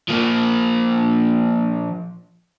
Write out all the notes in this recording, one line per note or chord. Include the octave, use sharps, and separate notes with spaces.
F3 A#3